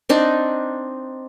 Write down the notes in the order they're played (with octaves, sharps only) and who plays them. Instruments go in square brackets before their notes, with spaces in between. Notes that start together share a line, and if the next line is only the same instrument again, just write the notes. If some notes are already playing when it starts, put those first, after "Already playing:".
[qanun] C4 D4 D#4